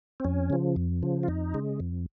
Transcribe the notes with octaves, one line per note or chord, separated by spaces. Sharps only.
C4
F2 C#4
C#3 F3
F2
C#3 F3
F4
F2 D#4
C#3 G#3
F2